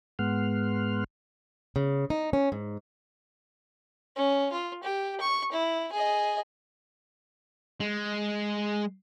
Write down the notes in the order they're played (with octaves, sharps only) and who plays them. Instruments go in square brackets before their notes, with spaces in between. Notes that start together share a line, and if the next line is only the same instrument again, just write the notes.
[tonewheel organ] G#2 G#3 B3 F#5 C6 F6
[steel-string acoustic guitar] C#3
D#4
C#4
G#2
[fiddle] C#4
F4
G4
C#6
E4
G#4 D#5
[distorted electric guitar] G#3